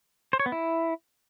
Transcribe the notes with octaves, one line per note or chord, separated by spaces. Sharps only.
C5
C#5
B3
E4